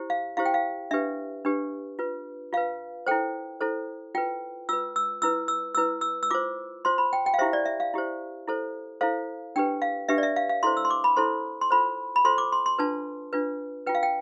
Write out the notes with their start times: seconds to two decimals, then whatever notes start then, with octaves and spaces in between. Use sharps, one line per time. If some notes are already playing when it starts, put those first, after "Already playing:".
Already playing: E4 G4 C5
0.10 F5
0.37 E4 G4 C5 F5
0.45 G5
0.54 F5
0.91 D4 G4 B4 E5
1.45 D4 G4 B4
1.99 F4 B4
2.53 F4 B4 F5
3.07 E4 A4 C5 G5
3.61 E4 A4 C5
4.15 F4 B4 G5
4.69 F4 B4 E6
4.96 E6
5.22 E4 B4 E6
5.48 E6
5.75 E4 B4 E6
6.01 E6
6.23 E6
6.31 F4 C5 D6
6.85 F4 C5 C6
6.98 B5
7.13 G5
7.26 G5
7.34 F5
7.39 E4 G4 C5 E5
7.53 D5
7.66 E5
7.80 F5
7.94 E4 G4 C5
8.47 E4 A4 C5
9.01 E4 A4 C5 F5
9.56 D4 G4 B4 G5
9.82 F5
10.09 D4 G4 B4 E5
10.18 D5
10.23 E5
10.36 F5
10.49 F5
10.63 E4 A4 C5 C6
10.77 E6
10.85 C6
10.90 D6
11.04 B5
11.17 E4 A4 C5 C6
11.61 C6
11.71 F4 A4 C5 B5
12.16 B5
12.25 F4 A4 C5 C6
12.38 D6
12.52 C6
12.66 C6
12.79 D4 F4 B4 A5
13.33 D4 F4 B4
13.87 F4 B4 G5
13.95 F5
14.03 G5